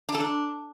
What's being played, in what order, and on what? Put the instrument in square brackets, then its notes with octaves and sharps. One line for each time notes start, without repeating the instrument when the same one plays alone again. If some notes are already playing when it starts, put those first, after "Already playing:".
[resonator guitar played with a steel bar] D4
A4
D4